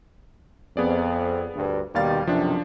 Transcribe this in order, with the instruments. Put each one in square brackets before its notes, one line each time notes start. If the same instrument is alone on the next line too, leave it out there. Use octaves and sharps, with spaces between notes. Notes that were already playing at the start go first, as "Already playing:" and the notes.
[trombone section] F2 [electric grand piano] B3 G#4 D5
[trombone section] D2 G2
[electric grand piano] D#2 F5 A6 [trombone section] B2 D#3 G3
[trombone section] B1 F#2 C3 [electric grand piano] F3 D4